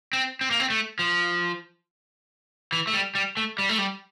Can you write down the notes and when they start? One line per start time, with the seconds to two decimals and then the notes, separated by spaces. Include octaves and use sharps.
0.13 C4
0.41 C4
0.51 A#3
0.60 C4
0.70 A3
0.99 F3
2.72 E3
2.87 A3
2.93 G3
3.15 G3
3.37 A3
3.59 G3
3.69 A3
3.78 G3